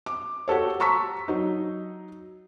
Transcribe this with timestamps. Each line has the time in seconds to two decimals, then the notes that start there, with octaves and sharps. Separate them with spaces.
0.06 D6
0.48 F#4 G4 A4 C#5
0.80 A5 A#5 C#6 E6 B6
1.28 F#3 D#4